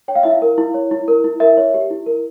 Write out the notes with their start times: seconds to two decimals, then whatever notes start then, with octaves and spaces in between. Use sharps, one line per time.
0.08 C#5 G5
0.15 F5
0.23 E4 E5
0.31 F5
0.42 A#4
0.58 E4
0.74 C#5
0.91 E4
1.08 A#4
1.24 E4
1.40 A#4 E5
1.57 C#5
1.74 G4
1.90 E4
2.06 A#4